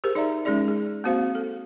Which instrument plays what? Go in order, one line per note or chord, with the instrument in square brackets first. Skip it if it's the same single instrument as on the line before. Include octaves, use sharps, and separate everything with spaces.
[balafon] G4 G#4 A#4 C5
D#4 D5 E5 A#5
G#3 C#4 D#4 G#4 D5
G#4
A#3 C4 F#4 C5 F5
A4